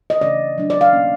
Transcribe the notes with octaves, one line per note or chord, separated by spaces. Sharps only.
D#5
C#3 E3 A3 C#4 D5
F#3 A3 D4
D5
F5
B2 F#3 A#3 C#4